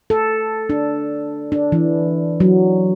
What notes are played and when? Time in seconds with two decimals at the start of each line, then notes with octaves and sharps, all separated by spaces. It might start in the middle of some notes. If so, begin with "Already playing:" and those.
0.10 A4
0.69 D4
1.52 D4
1.72 E3
2.40 F#3